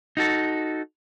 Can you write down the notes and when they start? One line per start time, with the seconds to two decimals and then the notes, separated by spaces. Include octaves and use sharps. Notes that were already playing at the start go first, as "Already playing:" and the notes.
0.17 D#4 F#4 A4